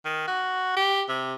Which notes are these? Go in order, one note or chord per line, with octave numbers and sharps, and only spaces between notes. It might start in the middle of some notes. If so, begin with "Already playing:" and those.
D#3
F#4
G4
C3